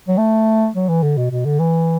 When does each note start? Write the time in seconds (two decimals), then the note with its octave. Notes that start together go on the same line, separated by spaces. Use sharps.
0.08 F#3
0.18 A3
0.75 F#3
0.89 E3
1.03 D3
1.17 B2
1.31 B2
1.45 D3
1.59 E3